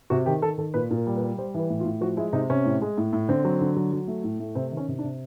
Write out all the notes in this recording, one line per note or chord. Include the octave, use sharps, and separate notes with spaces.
C3 F#4
D#3 G4
D#3 A4
D#3 A4
A#2 B4
A#2 A#4
G3
B4
G3
G3 C5
E3 B4
A2
F4
A2
F3 F#4
G#3 E4
C3 D#4
C3 C#4
A2
G#3
A2
A2
D3 C4
F#3
D3
F#3
F#3
A3
A2
A3
C3 C4
D#3
C#4
C3
D4
C3